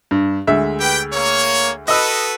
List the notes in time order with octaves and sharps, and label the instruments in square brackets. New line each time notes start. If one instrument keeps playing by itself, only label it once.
[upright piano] G2
D2 G#3 E5
[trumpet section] G4 B4 G5
A#3 C#5
[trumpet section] F#4 A4 B4 [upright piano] D#5 E6